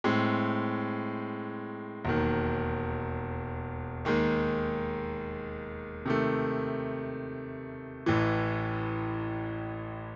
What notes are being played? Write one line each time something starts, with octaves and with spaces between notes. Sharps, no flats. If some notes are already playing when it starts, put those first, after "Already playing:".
A2 G#3 C4
E1 D#2 D#3
D#2 D#3 G#3
C3 D#3 A3
A1 A2 E3